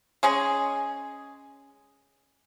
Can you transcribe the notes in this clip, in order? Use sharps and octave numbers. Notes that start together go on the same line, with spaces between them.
G#3 C#4 G#4